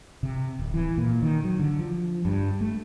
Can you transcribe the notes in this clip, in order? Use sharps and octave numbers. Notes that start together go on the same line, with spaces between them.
C3
D1
E3
A#2
D#3
F#3
D3
F3
G2
A3